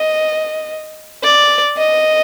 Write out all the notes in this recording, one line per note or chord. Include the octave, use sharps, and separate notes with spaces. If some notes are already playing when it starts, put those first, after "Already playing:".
Already playing: D#5
D5
D#5